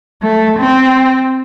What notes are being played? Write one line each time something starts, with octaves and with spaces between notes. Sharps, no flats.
A3
C4